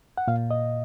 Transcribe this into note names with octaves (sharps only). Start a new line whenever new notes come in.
F#5
A#2 F5
D#5